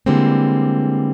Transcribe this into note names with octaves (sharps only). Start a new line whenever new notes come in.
D3 E3 G3 G#3 A#3 C4